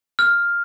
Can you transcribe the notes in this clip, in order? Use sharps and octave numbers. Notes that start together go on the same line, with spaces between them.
F6